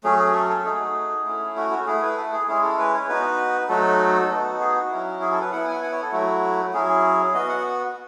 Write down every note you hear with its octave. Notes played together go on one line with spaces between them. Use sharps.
F#3 A3 C#4 G#4
G#4
A4
A4
A3 D#4 F#4 G#4
A3 C#4 E4
F#4
F#4
A3 E4 G#4
B4
A4
G#4
G#3 C#4 E4 G#4
A4
B4
C#5
B3 D#4 F#4 B4
F#3 A3 D#4 F#4 A4
B3 D#4 F#4
G#4
F#4
F#3 C#4 E4
G#4
A4
B4
B3 E4 F#5
G#5
F#5
C#5
A4
F#3 A3 E4 F#4
F#3 C#4 E4 G#4
G#4
B3 F#4 D#5
F#5